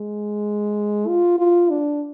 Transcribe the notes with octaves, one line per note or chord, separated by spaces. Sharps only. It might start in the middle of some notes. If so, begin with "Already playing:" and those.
Already playing: G#3
F4
F4
D4